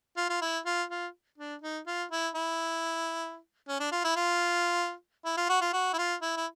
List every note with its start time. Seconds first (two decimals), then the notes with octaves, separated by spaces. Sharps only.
0.17 F4
0.30 F4
0.42 E4
0.66 F4
0.90 F4
1.38 D4
1.62 D#4
1.87 F4
2.11 E4
2.35 E4
3.69 C#4
3.80 D4
3.92 F4
4.04 E4
4.16 F4
5.25 E4
5.37 F4
5.49 F#4
5.61 F4
5.73 F#4
5.93 E4
5.98 F4
6.22 E4
6.37 E4